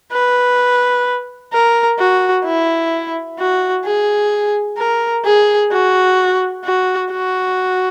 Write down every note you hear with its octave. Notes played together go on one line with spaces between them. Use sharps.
B4
A#4
F#4
E4
F#4
G#4
A#4
G#4
F#4
F#4
F#4